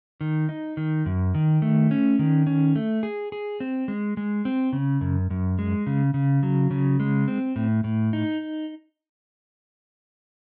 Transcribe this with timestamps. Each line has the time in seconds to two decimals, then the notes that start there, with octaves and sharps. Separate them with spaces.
0.21 D#3
0.49 D#4
0.77 D#3
1.06 F#2
1.35 D#3
1.62 A3
1.91 C#4
2.19 D#3
2.47 C#4
2.76 A3
3.03 G#4
3.32 G#4
3.60 C4
3.88 G#3
4.17 G#3
4.45 C4
4.73 C#3
5.01 F#2
5.30 F#2
5.59 G#3
5.87 C#3
6.14 C#3
6.43 F#3
6.71 C#3
7.00 G#3
7.28 C4
7.56 A2
7.84 A2
8.13 D#4